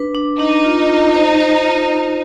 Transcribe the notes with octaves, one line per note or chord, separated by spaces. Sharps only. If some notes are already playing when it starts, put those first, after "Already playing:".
Already playing: D4 B4
D4
D4 D#4
F4
F4
C5
C5
F4
C5